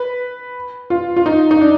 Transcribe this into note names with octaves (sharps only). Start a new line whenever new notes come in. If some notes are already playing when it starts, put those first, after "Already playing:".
Already playing: B4
F4
F4
D#4
D#4
D4